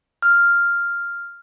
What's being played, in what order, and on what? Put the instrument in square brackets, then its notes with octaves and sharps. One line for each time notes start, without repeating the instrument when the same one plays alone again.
[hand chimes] F6